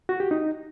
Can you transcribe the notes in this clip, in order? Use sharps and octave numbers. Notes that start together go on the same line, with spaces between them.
F#4
G4
D#4